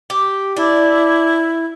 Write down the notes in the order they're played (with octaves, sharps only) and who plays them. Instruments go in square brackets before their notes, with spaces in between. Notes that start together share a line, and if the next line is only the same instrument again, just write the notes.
[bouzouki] G4
[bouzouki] D4 [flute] E4